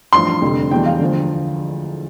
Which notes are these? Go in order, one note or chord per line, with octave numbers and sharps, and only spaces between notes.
A1 G2 F3 C6
F1 F2 D3 G3
E1 E2 B2 G3 G5
F5
D2 D3 F3